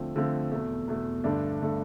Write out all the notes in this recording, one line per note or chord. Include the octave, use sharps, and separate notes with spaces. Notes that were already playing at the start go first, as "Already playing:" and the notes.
Already playing: D3 F3 A3 C4
D3 F3 A3 C4
E2 B2 A3
E2 B2 A3
G2 D3 A3 D4
D3 A3 D4